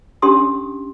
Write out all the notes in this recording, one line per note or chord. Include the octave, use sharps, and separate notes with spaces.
C#4 D4 G4 C6 D#6